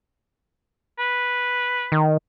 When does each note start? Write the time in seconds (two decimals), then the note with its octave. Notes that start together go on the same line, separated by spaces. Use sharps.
0.99 B4
1.92 D#3